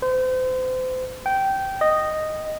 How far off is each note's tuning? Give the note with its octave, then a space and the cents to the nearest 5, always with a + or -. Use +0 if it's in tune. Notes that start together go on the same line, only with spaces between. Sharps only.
C5 -35
G5 -15
D#5 -5